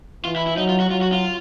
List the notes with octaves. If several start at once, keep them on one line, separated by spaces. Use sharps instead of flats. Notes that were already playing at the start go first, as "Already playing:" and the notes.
E3 F4
E4
E4
F#3 D#4
F4
F#4
F#3 F4
F#4
F4